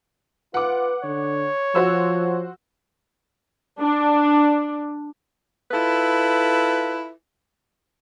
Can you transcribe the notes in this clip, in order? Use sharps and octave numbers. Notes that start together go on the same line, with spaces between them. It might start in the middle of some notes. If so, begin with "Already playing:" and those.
F4 B4 F#5 D6
D3 C#5
F3 F#4 C5 E6
D4
E4 F4 A4 B4